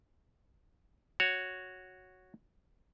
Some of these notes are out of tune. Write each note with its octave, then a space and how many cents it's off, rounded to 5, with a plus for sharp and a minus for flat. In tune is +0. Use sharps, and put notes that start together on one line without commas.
F#4 -5 C#5 +0